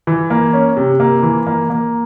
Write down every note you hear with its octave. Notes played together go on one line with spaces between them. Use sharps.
E3
A#3
C#4
C3
A#3
E3
A#3
A#3